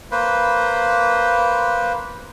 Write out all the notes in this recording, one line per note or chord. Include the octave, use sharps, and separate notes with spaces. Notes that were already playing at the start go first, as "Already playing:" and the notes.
A#3 B4 C5